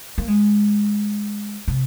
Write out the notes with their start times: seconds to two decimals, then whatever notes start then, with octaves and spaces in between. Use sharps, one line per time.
0.18 A#3
0.28 G#3
1.68 C3